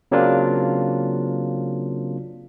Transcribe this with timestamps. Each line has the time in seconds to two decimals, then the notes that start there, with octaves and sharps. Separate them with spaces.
0.12 C#3 F#3 A#3 C4 D4 F4